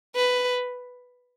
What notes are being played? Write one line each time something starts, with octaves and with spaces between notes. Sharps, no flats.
B4